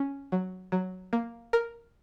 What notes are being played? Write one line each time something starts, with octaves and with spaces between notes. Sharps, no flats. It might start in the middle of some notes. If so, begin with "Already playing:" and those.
Already playing: C#4
F#3
F#3
A#3
A#4